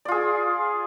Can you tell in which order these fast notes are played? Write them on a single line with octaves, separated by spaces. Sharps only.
D5 F4 G#4